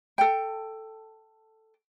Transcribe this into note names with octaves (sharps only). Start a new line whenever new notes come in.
A4 G5